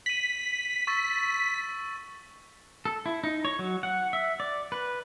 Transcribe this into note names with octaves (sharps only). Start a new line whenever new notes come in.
B6 D#7 F#7
C#6 E6 A6
A4
E4
D#4
C#5
F#3
F#5
E5
D5
B4